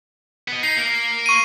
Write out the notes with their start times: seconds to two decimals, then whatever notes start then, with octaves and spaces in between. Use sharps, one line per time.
0.48 B3 D#5
0.63 D#4 C7
0.77 A#3
1.26 C#6 D#7